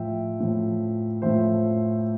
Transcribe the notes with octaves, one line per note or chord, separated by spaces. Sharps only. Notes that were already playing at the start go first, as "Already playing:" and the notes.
Already playing: A2 F3 E5 G5
A2 F3
A2 F3 C5 E5